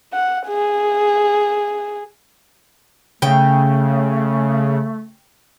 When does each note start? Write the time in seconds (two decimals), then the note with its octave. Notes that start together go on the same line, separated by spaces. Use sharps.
0.13 F#5
0.48 G#4
3.22 C#3 A3 G5